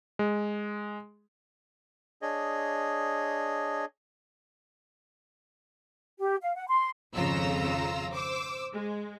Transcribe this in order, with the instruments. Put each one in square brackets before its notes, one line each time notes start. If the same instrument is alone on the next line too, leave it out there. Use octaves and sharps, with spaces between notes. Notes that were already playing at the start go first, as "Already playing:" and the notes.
[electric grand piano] G#3
[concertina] D4 G#4 C#5 D#5
[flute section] G4
F5
F#5
C6
[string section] G#1 F2 C#3 F4 A#5 E6
C5 D6 E6
G#3